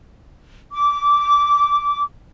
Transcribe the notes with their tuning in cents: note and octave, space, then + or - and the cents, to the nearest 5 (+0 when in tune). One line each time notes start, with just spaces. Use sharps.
D6 -15